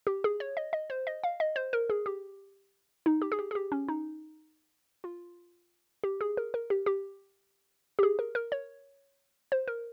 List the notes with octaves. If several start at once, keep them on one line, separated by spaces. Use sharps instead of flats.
G4
G#4
C#5
D#5
D#5
C5
D#5
F5
D#5
C5
A#4
G#4
G4
D#4
G4
G#4
G4
G#4
G4
C#4
D#4
F4
G4
G#4
A#4
A#4
G4
G4
G4
G#4
A#4
A#4
C#5
C5
A#4